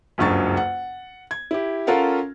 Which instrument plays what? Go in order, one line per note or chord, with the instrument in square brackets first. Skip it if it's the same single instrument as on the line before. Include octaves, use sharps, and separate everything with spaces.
[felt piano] F#1 C#2 G2 F#3 C#6 A6
F#5
G#6
E4 G4
C#4 F4 A4 A#4 F5 F#5